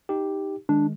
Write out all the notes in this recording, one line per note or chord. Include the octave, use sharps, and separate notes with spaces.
D#4 G4
D#3 G#3 D4